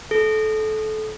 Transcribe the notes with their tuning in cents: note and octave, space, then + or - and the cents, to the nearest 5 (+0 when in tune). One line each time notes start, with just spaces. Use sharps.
A4 -25